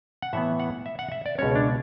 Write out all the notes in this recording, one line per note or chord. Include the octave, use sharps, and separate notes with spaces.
F#5
A2 E3 B3 E5
F#5
E5
F#5
E5
D5
C#2 B2 G#3 C#4 C#5
D4